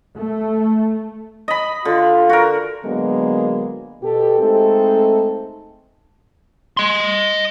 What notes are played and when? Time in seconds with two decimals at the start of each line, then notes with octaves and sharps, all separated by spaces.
0.17 A3
1.48 D#5 B5
1.85 D3 F4
2.29 F#4 A#4
2.84 D3 F#3 G#3 A#3 B3
4.02 B2 G4 A4
4.40 G#3 A3 C4 D#4 A4
6.77 D#5 C6